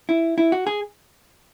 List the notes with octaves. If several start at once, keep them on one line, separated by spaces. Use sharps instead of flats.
E4
E4
F#4
G#4